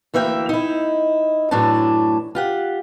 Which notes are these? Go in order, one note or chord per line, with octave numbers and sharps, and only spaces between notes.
D2 E3 A#3 E5 G5
D#4 E4
F#2 A2 E3 A3 D4 A5
F4 G4 F#5